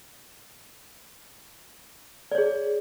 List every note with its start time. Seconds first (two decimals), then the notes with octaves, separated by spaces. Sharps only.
2.32 D5
2.35 C#5
2.38 G#4